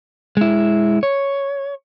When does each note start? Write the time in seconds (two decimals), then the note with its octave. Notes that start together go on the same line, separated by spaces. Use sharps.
0.37 G#3 E4
1.03 C#5